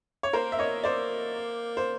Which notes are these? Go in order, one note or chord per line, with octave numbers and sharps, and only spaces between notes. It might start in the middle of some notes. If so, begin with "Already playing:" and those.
C#5
A#3 A#4 C5
E5
C#5 D#5
C5 D5
C5